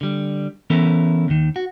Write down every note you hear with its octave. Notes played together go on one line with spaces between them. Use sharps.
D3 G3
E3 B3 C#4 E4 A4 A#4
D#2 D#3
F#4